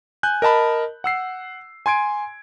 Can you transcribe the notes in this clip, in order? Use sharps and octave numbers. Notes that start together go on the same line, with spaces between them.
G#5 F#6 G6
A#4 D#5 A5 B5
F#5 E6 C7
G#5 C6 G#6 D7